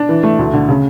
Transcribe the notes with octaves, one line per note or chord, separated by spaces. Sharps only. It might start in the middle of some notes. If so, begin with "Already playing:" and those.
Already playing: D4
E3
A3
D2
D3
C#3